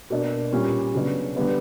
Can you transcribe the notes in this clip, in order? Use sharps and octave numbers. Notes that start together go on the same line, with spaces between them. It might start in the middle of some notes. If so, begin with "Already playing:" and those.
B2 A#3 D4
A#2 G3 C#4 G4
C#3 F#3 B3 D4
D3 G3 B3 D4